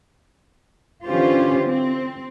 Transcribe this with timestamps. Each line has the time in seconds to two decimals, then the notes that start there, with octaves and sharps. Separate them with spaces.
1.06 D3 E3 C#4 F4 G4 C5
1.67 C4